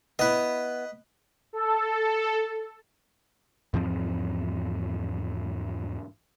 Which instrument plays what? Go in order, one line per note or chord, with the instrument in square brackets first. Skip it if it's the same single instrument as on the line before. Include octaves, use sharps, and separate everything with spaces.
[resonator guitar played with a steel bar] B3 E4 [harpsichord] B4 D#5
[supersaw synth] A4
[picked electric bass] E2 G#2 F3 C4